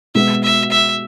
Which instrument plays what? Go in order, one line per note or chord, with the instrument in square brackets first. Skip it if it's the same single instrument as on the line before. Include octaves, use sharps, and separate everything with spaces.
[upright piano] B2 G#3 B3 [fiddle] E5
[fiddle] E5
E5